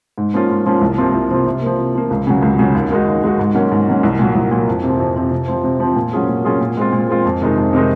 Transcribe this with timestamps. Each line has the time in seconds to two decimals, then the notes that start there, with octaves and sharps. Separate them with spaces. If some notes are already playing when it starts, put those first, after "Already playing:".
0.18 G#2
0.34 F3 A#3 C#4 F4
0.50 G#2
0.66 F3 A#3 C#4 F4
0.81 C2
0.98 C3 F3 A#3 F4
1.14 C2
1.31 C3 F3 A#3 F4
1.46 C3
1.62 F3 A#3
1.78 C3
1.95 F3 A#3
2.10 C#2
2.27 C#3 F#3
2.42 C#2
2.59 C#3 F#3
2.75 D#2
2.91 D#3 G#3 D#4 F#4
3.07 D#2
3.23 D#3 G#3 D#4 F#4
3.39 G#2
3.55 D#3 F#3 A#3 C#4
3.71 G#2
3.88 D#3 F#3 A#3 C#4
4.03 C2
4.19 A#2 F#3
4.35 C2
4.51 A#2 F#3
4.68 F2
4.84 C3 F3
5.00 F2
5.16 C3 F3
5.32 C3
5.48 F3 C4
5.64 C3
5.80 F3 C4
5.96 A#2
6.13 F#3 C#4 F4 G#4
6.28 A#2
6.45 F#3 C#4 F4 G#4
6.61 A#2
6.77 G#3 C4 F4
6.93 A#2
7.09 G#3 C4 F4
7.25 F2
7.41 C3 D#3 G#3 D#4
7.57 F2
7.73 C3 D#3 G#3 D#4